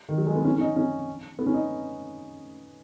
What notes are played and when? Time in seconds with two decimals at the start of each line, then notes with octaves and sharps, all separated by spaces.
0.09 D#3
0.18 F#3
0.26 G#3
0.35 B3
0.45 C#4
0.56 C#4
0.61 D#4
0.76 C#4
1.39 B3
1.46 C#4
1.54 D#4